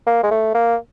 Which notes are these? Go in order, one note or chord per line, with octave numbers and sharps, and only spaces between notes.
A#3
G#3
A3
A#3